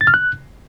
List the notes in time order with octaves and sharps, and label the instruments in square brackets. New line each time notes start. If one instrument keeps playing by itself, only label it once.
[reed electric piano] A6
F6
F#6